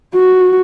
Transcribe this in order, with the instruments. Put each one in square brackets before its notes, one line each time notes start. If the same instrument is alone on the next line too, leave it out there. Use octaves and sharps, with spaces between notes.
[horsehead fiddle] F#4